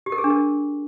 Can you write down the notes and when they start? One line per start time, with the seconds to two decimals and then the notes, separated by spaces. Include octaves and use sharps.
0.06 G4
0.12 A#4
0.18 G#4
0.24 D4
0.30 A#4